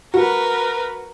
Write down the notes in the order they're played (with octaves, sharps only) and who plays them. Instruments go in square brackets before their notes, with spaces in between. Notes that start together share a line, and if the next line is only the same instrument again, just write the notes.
[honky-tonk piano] F#4 [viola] A#4 B4